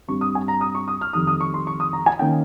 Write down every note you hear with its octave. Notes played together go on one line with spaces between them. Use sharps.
G2 G3 C4 C#6
D#6
G#5
A#5
D#6
C#6
D#6
F6
F2 D#3 G3 D#6
D#6
C#6
C6
C#6
D#6
A#5
G#5
D#3 A#3 C#4 G5